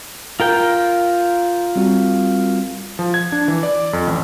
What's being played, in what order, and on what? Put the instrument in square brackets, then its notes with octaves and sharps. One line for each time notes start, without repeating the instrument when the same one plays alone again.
[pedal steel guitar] F4 A#4 G5
[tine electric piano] G3 C4 F#4
[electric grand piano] F3
G#6
D4
E3
D5
F2
A1